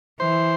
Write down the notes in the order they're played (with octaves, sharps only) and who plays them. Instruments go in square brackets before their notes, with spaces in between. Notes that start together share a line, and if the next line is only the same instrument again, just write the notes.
[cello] E3 [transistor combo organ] C5